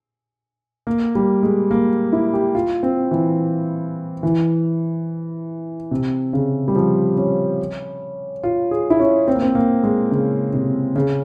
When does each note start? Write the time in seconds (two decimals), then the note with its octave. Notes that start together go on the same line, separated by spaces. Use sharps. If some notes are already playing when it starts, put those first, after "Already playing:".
0.87 A#3
1.15 G3
1.43 G#3
1.71 A#3
2.13 E4
2.34 G4
2.55 F4
2.83 C4
3.11 E3
4.23 E3
5.91 C3
6.33 C#3
6.68 G3
6.76 F3
7.17 C#4
8.43 F4
8.71 G#4
8.90 E4
9.00 C#4
9.28 C4
9.35 A#3
9.42 C4
9.55 A#3
9.84 G#3
10.11 C#3
10.54 C3
10.96 C#3